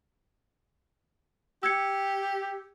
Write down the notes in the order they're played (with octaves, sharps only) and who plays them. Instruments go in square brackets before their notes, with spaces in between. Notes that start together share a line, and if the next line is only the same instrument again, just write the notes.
[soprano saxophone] G4 [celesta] E6 G#6 C#7